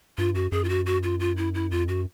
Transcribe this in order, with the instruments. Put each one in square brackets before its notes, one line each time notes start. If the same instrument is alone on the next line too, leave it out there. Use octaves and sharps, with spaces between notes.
[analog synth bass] G2 [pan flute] F4
[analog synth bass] F#2 [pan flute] F#4
[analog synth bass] F#2 [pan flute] G#4
[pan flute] F4
F#4
F#4
F4
F4
E4
E4
[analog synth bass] F2 [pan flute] F4
[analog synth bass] F#2 [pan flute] F#4